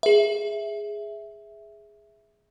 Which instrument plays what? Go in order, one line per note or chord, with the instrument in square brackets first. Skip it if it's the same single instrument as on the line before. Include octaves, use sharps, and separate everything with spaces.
[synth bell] G#4 E5